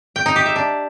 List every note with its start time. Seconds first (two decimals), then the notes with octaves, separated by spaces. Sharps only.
0.16 G5
0.26 D#4
0.36 G4
0.46 E5
0.56 D4